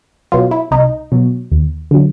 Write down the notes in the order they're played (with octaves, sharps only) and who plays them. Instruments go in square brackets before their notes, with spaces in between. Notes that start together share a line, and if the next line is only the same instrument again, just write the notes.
[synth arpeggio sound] B2 F#3 F4
E4
C2 D#4
B2 F#3
D#2
D3 F#3